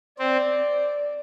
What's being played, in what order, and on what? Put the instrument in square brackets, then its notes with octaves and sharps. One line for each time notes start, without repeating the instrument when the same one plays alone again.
[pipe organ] C4 [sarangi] D5